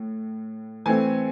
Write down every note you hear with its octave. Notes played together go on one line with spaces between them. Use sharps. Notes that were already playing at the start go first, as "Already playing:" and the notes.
Already playing: A2
E3 A3 C4 G#5